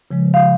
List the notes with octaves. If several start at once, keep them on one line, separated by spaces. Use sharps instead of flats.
C#3 F3 G#3
F5